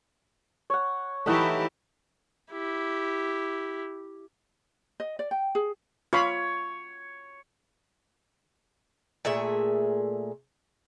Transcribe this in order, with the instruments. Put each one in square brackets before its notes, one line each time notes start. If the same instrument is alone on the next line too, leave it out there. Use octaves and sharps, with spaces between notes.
[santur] C#5 F#5
[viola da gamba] E3 E4 G4 [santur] A3 D#4 F#5
[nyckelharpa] E4 G4
[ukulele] D#5
D5
G5
G#4
[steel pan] F4 F5 B5 [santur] C#5
[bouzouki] A#2 A3 G#4 E5